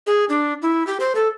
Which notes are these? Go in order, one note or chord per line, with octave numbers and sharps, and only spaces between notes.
G#4
D4
E4
G4
C5
A4